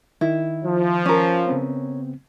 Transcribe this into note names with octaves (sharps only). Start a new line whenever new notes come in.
D#3 E4
F3
C#4 A#4
C#3 B3 C4